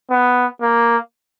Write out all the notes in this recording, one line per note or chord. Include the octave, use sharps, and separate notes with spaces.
B3
A#3